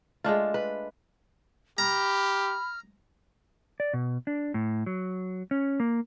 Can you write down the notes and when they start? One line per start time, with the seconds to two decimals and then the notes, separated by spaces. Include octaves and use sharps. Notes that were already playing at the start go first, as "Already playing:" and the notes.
0.24 G#3 A3 D4 F4
0.54 B4
1.78 G4 A#5 B5 F6
3.80 D5
3.93 B2
4.27 D4
4.54 A2
4.86 F#3
5.51 C#4
5.80 A#3